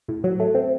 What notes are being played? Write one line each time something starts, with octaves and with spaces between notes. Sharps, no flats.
A2
F#3
A3
C4